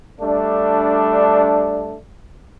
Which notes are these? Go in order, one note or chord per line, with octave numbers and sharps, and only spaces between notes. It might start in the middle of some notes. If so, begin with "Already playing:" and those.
G3 A3 D4